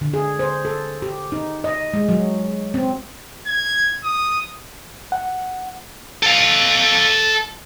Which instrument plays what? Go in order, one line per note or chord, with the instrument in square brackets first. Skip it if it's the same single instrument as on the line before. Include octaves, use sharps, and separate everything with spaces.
[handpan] D3
G#4
C5
A4
G4
D#4
D#5
G#3
F#3
C4
[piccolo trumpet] G#6
D#6
[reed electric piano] F#5
[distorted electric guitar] A4 F5